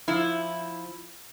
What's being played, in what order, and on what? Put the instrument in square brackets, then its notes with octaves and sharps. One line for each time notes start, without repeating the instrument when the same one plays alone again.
[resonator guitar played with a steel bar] F3 E4